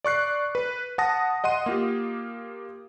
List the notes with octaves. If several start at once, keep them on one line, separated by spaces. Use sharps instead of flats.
D5 C#6 F#6 C7
B4
F#5 A5 D#6 A#6
D#5 F#5 C6 D#7
A#3 F4 G4